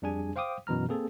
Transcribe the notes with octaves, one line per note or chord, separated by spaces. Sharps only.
F2 G3 D4 G#4 G#5
C5 F5 G5 D6 D#6
F#2 B2 E3 A#5 F6
A#3 C4 G#4 A4